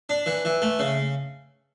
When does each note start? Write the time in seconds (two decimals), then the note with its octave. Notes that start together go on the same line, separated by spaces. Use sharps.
0.09 D4
0.26 E3
0.45 E3
0.62 A3
0.79 C#3